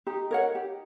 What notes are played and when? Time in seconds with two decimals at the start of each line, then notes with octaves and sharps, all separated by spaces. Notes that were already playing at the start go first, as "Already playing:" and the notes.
0.07 D#4 G4
0.31 A#4 C#5 F#5
0.55 G4